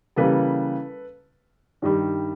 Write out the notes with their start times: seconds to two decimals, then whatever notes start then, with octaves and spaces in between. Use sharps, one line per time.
0.16 C#3 E3 G3 A#3 A4 B4
1.82 G2 D#3 G3